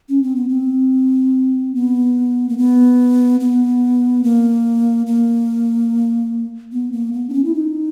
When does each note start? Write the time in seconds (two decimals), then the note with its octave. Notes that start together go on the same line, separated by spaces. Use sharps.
0.09 C#4
0.23 C4
0.36 B3
0.49 C4
1.75 B3
2.49 A#3
2.58 B3
3.40 B3
4.24 A#3
5.07 A#3
6.72 B3
6.92 A#3
7.13 B3
7.29 D4
7.34 C#4
7.44 E4
7.54 D#4